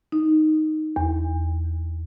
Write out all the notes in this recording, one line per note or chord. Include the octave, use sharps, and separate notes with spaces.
D#4
E2